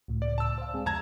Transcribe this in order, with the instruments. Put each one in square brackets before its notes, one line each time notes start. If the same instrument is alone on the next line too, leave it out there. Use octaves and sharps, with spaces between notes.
[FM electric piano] C#2 A2
[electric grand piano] D5
A5 E6
[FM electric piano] C5 F5
G#3 C4 G#4
[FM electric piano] F2 D3 [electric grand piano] A5 A#5 G#6